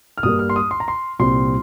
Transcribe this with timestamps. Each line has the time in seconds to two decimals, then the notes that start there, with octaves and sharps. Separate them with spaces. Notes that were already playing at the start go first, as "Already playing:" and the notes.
0.18 F6
0.23 G2 G3 A#3 D#6
0.39 F6
0.50 C6
0.56 D#6
0.71 C6
0.80 A#5
0.88 C6
1.19 C2 A#2 G3 C4 C6